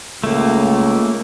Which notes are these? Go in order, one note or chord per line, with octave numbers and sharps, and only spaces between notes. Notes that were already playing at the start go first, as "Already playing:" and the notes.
C#2 A3 A#3